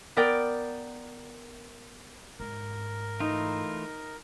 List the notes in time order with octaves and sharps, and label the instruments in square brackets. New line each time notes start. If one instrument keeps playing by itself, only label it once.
[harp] B3 A#4 D5 G5
[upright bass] G#2 [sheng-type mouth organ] A#4
[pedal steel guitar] E3 A3 F4 [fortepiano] D#4